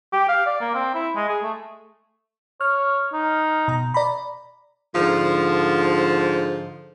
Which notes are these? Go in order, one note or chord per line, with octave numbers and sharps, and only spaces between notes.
G4
F5
D5
A#3
C4
E4
G#3
G#4
A3
C#5 F6
D#4
B2 A#5
D5 A#5 B5
G#2 D3 F3